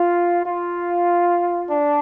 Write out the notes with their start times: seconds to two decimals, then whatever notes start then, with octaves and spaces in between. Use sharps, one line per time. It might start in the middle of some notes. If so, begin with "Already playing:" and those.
Already playing: F4
0.45 F4
1.70 D4